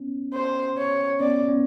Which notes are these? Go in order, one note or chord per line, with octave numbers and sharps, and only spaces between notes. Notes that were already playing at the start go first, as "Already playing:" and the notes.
Already playing: B3 C#4
C5
C#5
B3 C#4 D5
B3 C#4